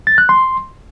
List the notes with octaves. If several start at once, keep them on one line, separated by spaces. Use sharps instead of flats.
A6
F#6
C6